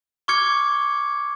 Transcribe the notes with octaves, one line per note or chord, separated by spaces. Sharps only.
C#6 D6 F6 G#6 C#7